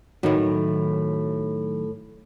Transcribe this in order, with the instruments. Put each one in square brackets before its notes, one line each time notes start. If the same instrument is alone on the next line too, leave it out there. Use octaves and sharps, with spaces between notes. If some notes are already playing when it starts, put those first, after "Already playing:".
[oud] A2 E4 [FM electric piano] D#3 F#3